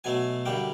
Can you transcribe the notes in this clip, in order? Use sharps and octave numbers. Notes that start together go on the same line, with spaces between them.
B2 F#3 A3 G#5
F#2 D3 G3 A#3 G5